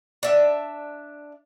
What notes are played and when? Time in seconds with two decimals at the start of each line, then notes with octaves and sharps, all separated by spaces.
0.23 D4 E5